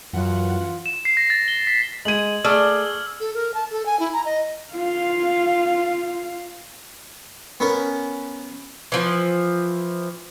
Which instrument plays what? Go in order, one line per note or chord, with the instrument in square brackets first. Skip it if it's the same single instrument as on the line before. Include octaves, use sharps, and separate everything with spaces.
[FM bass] F#2 [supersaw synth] E3 F#5 [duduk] F4
[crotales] E7
C7
A#6
A6
G7
B6
[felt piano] G#3 D#7 [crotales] G#6 F#7
[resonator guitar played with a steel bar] A3 D5 [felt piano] G#4 [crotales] E6 F6
[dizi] A4
A#4
A5
A4
G#5
E4
A#5
D#5
[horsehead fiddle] F4 F5
[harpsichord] B3 C#4 A#4
[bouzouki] E3 F3